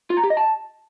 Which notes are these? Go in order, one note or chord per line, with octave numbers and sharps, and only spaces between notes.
F4
A#5
G4
D#5
A5